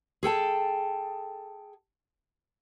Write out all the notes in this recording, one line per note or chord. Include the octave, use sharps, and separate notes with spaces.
G#4 A4 G5 A5